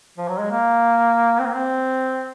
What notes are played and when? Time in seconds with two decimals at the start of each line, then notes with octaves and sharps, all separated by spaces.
0.18 F3
0.28 F#3
0.39 G#3
0.50 A#3
1.39 C4
1.46 A#3
1.54 C4